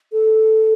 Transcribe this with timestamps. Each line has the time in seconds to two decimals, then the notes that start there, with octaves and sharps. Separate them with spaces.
0.12 A4